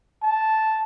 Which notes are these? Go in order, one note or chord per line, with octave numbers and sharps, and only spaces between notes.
A5